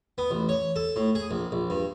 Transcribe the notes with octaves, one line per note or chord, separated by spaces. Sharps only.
B3
A1
C#5
A4
A2
G#4
A#1
A#1
G2